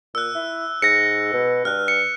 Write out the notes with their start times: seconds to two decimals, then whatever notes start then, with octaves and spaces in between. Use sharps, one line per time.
0.15 A#2 E6 F#6
0.35 E4
0.82 G#2 A#6 C#7
1.33 B2
1.65 G2 F6 F#6
1.88 C#7